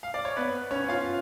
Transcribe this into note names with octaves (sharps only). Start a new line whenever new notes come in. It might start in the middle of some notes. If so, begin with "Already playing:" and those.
F5
D5
C#5
B3 B4
C#4 C#5
F4 F5